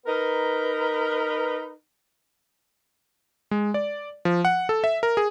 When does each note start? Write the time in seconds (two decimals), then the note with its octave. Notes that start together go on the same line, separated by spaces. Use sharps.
0.06 D#4 A#4 B4
3.51 G#3
3.74 D5
4.25 F3
4.45 F#5
4.69 A4
4.84 E5
5.03 A#4
5.17 G#4